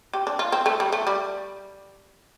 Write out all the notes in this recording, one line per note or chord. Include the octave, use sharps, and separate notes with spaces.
G4
D4
F4
C4
A3
G3
A3
G3